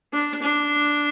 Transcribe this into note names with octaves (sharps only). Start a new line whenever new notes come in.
D4
D4